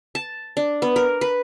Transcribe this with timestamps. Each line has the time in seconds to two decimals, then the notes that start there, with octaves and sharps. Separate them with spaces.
0.15 A5
0.57 D4
0.82 B3
0.96 A#4
1.21 B4